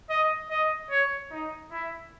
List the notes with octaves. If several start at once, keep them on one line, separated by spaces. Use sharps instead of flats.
D#5
D#5
C#5
D#4
E4